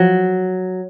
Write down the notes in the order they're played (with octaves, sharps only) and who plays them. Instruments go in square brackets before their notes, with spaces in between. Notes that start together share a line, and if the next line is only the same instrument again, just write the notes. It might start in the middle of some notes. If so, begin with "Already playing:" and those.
Already playing: [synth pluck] F3 [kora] F#3